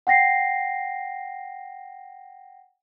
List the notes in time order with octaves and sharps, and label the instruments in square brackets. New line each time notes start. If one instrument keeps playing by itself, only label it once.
[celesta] F#5 G5 A#6 C7